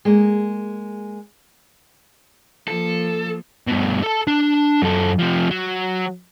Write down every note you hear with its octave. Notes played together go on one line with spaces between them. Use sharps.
G#3 A#3
F3 A#3 A4
G2 B2
A4 A5
D4
F#2 A4
C3 F3
F#3